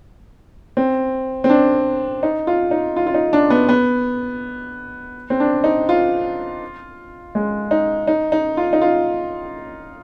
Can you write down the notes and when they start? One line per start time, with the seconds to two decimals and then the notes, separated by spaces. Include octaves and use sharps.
0.77 C4
1.44 C4
1.50 D4
2.23 D#4
2.47 F4
2.71 D#4
2.96 F4
3.07 F4
3.14 D#4
3.33 D4
3.50 B3
3.69 B3
5.30 C4
5.40 D4
5.64 D#4
5.89 F4
7.35 G#3
7.71 D#4
8.07 D#4
8.32 D#4
8.57 F4
8.73 D#4
8.81 F4